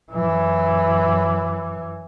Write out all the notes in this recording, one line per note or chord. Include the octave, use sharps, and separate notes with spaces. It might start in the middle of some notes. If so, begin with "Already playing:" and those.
F#2 E3